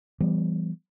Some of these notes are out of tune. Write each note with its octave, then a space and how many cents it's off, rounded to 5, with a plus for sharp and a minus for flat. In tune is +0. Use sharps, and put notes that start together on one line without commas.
E3 +35 G3 +5 B3 +0